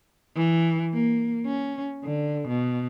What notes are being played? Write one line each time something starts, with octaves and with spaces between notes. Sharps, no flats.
E3
A#3
C#4
D3
B2